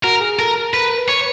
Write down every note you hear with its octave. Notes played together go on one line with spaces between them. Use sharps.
F#4 A#4
G#4
A4 A#4
A#4
A#4 B4
B4
C#5